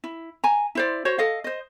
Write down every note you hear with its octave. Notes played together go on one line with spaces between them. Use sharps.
E4
G#5 A#5
E4 C5 D5
F#4 C5 C#5
A4 D#5 F5
C5 D#5